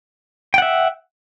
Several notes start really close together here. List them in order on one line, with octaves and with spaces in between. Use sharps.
G5 F#5 E5